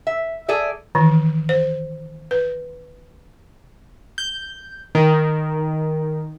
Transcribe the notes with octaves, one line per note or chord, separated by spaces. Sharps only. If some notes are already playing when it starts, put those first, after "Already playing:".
E5
G#4 A4 D5 E5
D#3 E3
C5
B4
G6
D#3